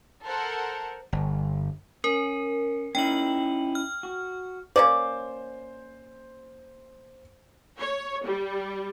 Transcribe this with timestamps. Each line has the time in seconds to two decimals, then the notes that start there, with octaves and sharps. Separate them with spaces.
0.25 A4 A#4 C5 F#5
1.13 G1
2.04 C#4 A#4
2.95 C#4 D#4 E4 G5 F#7
3.75 F6
4.03 F#4
4.76 A#3 C#4 C5 D5
7.78 C#5
8.25 G3